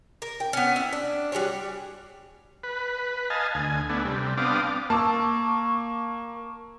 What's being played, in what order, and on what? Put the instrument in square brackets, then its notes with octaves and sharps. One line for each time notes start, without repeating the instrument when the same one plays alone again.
[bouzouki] A#4
G5
B3 C#4
E4
D4
G3 F#4 G#4 C#5
[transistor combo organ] B4
D#5 F5 G#5 A5
D2 G#5
A3 B3 D4
C3 G3
B3 C4 D4 F5 D6 D#6
[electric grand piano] A#3 [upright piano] A5 D6 E6 [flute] C#6